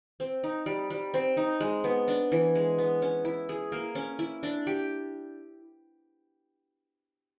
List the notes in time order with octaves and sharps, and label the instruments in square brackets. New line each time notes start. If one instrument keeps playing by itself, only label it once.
[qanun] C4
D#4
G3
G3
C4
D#4
G#3
B3
D4
E3
G#3
B3
C#4
E4
G#4
A#3
C#4
E4
D4
G4